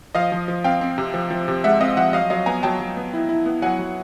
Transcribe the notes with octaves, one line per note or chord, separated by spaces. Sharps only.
F3 D#5 F5
F3
F3
C4 F5 G5
C4
C3
F3
F3
C3
G#3 E5 F#5
C4 D#5 F5
F3 E5 F#5
F#3 D#5 F5
F#3 D#5 F5
B3 G#5 A#5
F#3 G5 A5
F#3
B3
E4
E4
B3
F#3 F#5 G#5
F#3